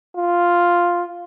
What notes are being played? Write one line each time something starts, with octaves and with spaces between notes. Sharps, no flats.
F4